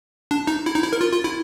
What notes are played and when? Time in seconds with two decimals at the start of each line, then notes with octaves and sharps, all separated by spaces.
0.31 D4
0.47 D#4
0.66 E4
0.75 D#4
0.83 E4
0.93 A#4
1.01 F4
1.13 F4
1.24 E4